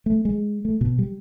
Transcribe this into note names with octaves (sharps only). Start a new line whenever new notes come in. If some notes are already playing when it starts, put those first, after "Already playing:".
A3
G#3
A3
B2
G3